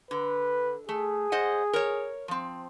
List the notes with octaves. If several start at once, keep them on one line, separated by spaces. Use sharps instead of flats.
D3 B4
A3 G#4
C5 D#5 F#5
A#4 C#5
F3 C4